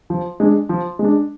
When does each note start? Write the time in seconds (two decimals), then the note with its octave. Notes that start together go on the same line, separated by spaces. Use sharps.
0.10 F3
0.40 G#3 D4
0.69 F3
0.99 G#3
1.04 D4